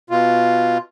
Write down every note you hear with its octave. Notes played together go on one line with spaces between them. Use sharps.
B2 F4